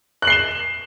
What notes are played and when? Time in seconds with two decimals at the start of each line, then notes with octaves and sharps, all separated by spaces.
0.22 F#6
0.25 F#7
0.27 C7
0.30 G7
0.33 E7